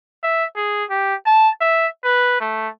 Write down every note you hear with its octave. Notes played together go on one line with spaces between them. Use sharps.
E5
G#4
G4
A5
E5
B4
A3